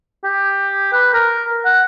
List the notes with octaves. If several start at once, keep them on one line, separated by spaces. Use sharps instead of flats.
G4
B4
A#4
F#5